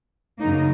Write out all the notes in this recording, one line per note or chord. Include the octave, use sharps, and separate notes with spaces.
F#2 C#3 F#3 A#3 D#4